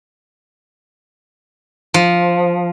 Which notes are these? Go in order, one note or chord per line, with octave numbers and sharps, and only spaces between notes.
F3